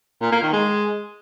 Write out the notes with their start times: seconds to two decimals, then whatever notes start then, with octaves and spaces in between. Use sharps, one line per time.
0.22 A#2
0.32 A#3
0.42 D#3
0.53 G#3